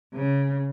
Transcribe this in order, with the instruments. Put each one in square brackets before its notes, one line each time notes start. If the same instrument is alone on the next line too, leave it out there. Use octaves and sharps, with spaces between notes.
[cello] C#3